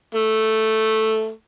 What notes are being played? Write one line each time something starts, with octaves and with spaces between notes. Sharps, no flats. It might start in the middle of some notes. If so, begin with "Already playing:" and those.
A3